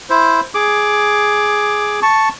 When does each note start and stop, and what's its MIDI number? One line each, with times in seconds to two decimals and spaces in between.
0.10 0.41 64
0.10 0.41 72
0.55 2.00 68
0.55 2.00 86
2.03 2.29 81
2.03 2.29 85